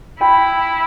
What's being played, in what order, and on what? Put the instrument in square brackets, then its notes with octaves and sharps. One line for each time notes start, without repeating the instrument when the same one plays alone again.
[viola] E4 [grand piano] G5 B5